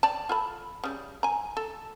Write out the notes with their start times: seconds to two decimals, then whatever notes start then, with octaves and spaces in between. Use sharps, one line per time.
0.03 D5 G5 A5
0.29 F4 A4 B5
0.84 C#3 G3
1.23 G#5 A#5
1.57 A4